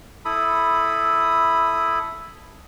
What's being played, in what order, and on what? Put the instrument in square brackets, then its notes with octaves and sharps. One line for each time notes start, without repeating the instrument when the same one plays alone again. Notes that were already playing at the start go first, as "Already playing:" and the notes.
[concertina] E4 A4 B5 D#6